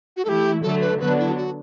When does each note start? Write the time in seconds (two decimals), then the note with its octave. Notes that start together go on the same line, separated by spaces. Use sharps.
0.17 F#4
0.25 E3 A3 E4 G4 A4
0.62 D3 F#3 A3 A4
0.81 B4
1.00 D3 F#3 B3 D4 B4
1.19 E4
1.37 F#4